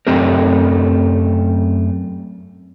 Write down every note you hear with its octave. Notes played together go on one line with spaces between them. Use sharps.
F#2 A3 C4 G4 A#4